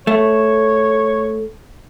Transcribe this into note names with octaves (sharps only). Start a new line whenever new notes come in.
A3 C#5